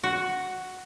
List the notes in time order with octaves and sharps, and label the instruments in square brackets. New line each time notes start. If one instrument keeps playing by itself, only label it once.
[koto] F#4